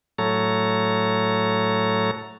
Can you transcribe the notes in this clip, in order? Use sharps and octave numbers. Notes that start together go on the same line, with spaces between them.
A2 F#3 A3 A4 C#5 A#5